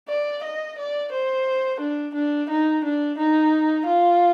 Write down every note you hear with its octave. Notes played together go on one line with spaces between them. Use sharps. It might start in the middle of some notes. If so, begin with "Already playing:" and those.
D5
D#5
D5
C5
D4
D4
D#4
D4
D#4
F4